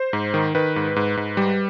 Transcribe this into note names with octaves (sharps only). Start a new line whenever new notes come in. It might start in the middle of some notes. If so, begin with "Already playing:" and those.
Already playing: C5
G#2
D#3
D#3 B4
G#2
G#2
G#2
G3